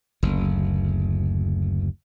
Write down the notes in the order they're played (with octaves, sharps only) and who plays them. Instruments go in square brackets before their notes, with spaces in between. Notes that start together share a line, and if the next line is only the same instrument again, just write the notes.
[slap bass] F#1 D2